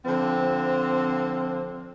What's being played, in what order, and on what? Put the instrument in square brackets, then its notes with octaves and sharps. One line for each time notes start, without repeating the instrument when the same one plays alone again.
[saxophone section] D3 F3 C4